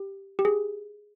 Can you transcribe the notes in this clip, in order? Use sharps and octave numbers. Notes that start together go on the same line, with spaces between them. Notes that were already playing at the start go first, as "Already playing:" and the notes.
Already playing: G4
G4
G#4